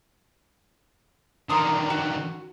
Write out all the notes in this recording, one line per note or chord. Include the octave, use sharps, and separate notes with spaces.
D3 D#3 A#5 C6 D#6
F#4